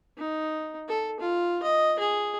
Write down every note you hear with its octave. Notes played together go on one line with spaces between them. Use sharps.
D#4
A4
F4
D#5
G#4